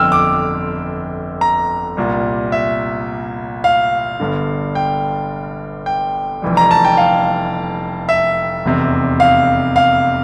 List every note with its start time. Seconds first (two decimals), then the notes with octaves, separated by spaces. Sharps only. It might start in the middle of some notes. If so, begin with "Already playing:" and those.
Already playing: G1 F2 D3 G5 E6 F6
0.12 D6
1.41 A#5
1.97 C2 A#2 G3
2.52 E5
3.64 F5
4.20 G1 G2 D3
4.75 G5
5.86 G5
6.42 F1 F2 E3 G3
6.57 A#5
6.71 A5
6.85 G5
6.97 F5
8.09 E5
8.65 F1 E2 C3
9.20 F5
9.76 F5